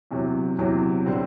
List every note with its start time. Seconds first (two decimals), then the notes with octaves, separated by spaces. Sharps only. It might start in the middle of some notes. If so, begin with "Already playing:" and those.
0.11 E2 C3 F#3
0.59 E2 C3 F#3
1.06 D3 G3 C4